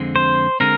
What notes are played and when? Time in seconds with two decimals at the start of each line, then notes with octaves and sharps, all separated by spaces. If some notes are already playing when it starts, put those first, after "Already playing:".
Already playing: F2 D3 G#3 C4
0.16 C5
0.60 D3 G#3 C4 A#4